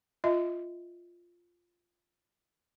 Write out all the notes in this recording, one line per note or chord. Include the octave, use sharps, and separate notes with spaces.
F4 D#5 E5